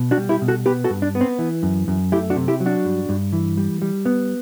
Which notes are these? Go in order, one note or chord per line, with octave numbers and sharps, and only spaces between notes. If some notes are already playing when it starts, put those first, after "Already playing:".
Already playing: B2
D4 F#4
G3
E4 G4
B2
F#4 A4
B3 G4 B4
F#4 A4
G2
D4
B3
C4
E3
F#2
F#2
A3 E4 G4
D4 F#4
C3
E4 G4
F#3
D4 F#4
G2
G2
E3
G3
G3
B3